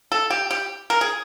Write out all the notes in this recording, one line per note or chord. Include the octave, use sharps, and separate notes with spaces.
A4
G4
G4
A#4
G#4